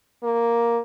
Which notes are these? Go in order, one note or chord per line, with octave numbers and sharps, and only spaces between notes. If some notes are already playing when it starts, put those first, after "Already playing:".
A#3